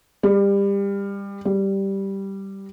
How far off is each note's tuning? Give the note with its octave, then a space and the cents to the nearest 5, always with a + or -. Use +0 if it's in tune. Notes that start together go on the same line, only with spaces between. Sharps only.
G3 +25
G3 -5